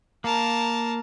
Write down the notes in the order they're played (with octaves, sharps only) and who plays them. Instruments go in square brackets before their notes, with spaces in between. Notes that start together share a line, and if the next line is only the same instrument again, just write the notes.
[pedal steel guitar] A#3 [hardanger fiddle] A#4 A5